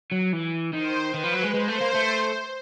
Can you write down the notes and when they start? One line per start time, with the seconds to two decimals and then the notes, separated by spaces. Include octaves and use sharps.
0.12 F#3
0.33 E3
0.73 D#3 C5
1.13 D#3 B4
1.24 F3
1.34 F#3
1.44 G#3
1.54 G#3 C5
1.69 A3
1.81 A#3
1.95 A3